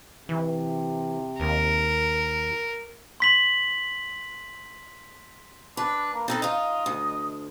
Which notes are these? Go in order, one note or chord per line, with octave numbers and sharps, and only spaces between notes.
C3 E3
D#2 A#4
C6 B6 F#7
D4 B4
A#3
C4 D#4 A4 B4
D#4 F4 D#5
D2